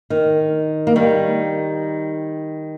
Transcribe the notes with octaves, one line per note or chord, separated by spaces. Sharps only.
D#3
A#3
D#3 G3